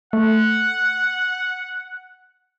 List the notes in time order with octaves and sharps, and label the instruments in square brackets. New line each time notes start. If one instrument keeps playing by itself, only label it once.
[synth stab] A3 [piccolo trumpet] F#5